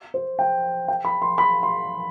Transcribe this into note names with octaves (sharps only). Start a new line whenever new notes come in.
C5
G5
G5
B5
C6
B5
C6